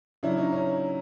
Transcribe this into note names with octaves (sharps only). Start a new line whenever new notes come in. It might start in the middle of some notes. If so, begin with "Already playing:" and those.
C#3 F#3 D4 E4
C#4 D#4
C#4